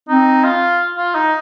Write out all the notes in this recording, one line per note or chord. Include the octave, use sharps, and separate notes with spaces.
C4 D#4
F4
F4
D#4